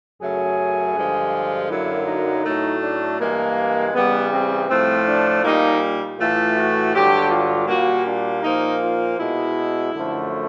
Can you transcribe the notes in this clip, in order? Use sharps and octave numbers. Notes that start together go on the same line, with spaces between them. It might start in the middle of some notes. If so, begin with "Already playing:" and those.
F#2 C#3 F#3 A3 G#4
G2 D3 F3 G#3
F#2 D3 F#3 A#3 E4
D#4
A2 F#3 A3
D4
G2 E3 G#3 A#3
C#3 E3 G3 B3
C4
A2 F3 A3 C4
D4
A#2 G3 A#3 D#4
A2 E3 A3 F4
F#4
G2 D3 F#3 G4
F4
A#2 G3 A#3 F#4
D4
A#2 F3 A#3 D#4
F4
B2 G#3 E4
F#2 D3 F3 A3